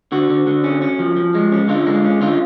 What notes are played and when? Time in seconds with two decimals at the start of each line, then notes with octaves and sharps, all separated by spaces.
0.12 D3 F#4
0.30 D3
0.47 D3
0.64 C#4
0.82 C#4
0.99 F3
1.16 F3
1.34 G#3
1.52 C#4
1.68 D3 F4
1.86 G#3
2.04 C#4
2.21 D3 F4